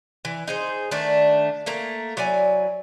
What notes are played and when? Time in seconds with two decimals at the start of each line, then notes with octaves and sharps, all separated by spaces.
0.25 E3
0.48 D#4 G#4 C5
0.91 D#3 A3 D4
1.66 A3 A#3 A#5
2.17 F#3 E4 D5 G#5